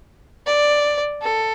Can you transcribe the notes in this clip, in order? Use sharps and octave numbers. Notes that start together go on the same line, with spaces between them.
D5
A4